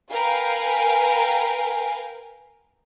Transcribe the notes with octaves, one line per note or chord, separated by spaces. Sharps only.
A#4 B4 F5 G5 G#5